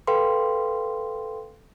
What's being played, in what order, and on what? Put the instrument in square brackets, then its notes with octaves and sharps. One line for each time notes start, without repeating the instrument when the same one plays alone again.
[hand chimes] A4 B4 F5 G5 C6